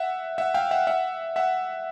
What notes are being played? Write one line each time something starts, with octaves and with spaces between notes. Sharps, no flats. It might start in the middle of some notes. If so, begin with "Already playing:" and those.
Already playing: E5 F#5
E5 F#5
F5 G5
E5 F#5
E5 F#5
E5 F#5